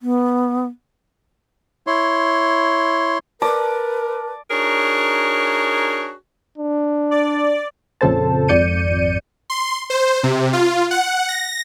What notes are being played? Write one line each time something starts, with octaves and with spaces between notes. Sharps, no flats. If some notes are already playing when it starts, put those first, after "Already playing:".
B3
E4 C#5 C6
A#4 B4 D5 A5
D4 D#4 F#4 G#4 A#4 C#5
D4
D5
A#1 F2 C#3 A4 C5 A5
G#1 F2 D5 G6 C#7 D#7
C6
C5
C3
F4
F#5
A#6